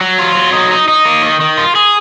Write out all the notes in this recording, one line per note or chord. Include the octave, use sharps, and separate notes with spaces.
F#3
F4
F#3
D#4
D#4
D#4
A#3
D#3
D#3
F4
G#4